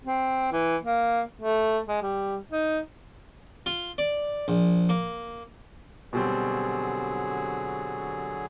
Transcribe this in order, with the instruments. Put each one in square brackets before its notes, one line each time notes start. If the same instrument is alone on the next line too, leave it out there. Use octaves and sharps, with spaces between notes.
[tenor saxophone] C4
E3
A#3
A3
G#3
G3
D#4
[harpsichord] F4
D5
A#1
A#3
[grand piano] B2 G3 C4 [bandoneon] D3 F#3 G#4